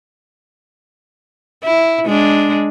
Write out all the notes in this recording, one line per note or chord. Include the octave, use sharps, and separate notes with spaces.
E4
G#3 D4